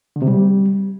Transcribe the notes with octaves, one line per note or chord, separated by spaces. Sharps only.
D3
C3
G3